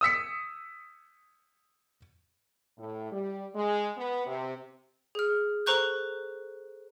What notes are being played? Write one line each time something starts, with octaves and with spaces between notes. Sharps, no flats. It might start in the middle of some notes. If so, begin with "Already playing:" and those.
D#6 E6 B6 C#7
A2
G3
G#3
B3
C3
G#4 F6
A4 C5 A#5 C#6 F#6 G6